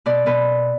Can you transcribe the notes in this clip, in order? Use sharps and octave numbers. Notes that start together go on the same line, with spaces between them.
B2 D5
B2 B4